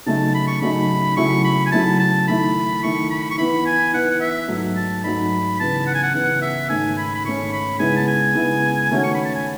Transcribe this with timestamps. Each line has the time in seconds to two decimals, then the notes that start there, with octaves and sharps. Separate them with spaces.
0.06 C#3 F#3 A3 D#4 A5
0.34 B5
0.47 C#6
0.61 C#3 F#3 A3 D#4 B5
1.17 C#3 F#3 A3 E4 C#6
1.44 B5
1.66 G#5
1.72 C#3 F#3 A3 E4 A5
1.99 A5
2.27 D#3 A3 E4 B5
2.83 D#3 A3 E4 C#6
3.10 B5
3.31 C#6
3.38 E3 B3 E4 B5
3.66 G#5
3.93 E3 B3 E4 F#5
4.10 F#5
4.21 E5
4.48 G#2 F#3 A3 D#4
4.76 A5
5.04 G#2 F#3 A3 D#4 B5
5.59 C#3 E3 B3 A5
5.87 F#5
5.95 G#5
6.03 F#5
6.14 C#3 E3 B3 F#5
6.42 E5
6.69 G#2 D#3 A3 C#4 G#5
6.98 B5
7.15 B5
7.25 G#2 D#3 A3 C#4 C#6
7.52 B5
7.79 C#3 G#3 B3 E4 G#5
7.96 A5
8.08 G#5
8.35 C#3 G#3 B3 E4
8.90 D#3 A3 C#4 F#4
9.03 C#6
9.14 B5
9.25 A5
9.35 G#5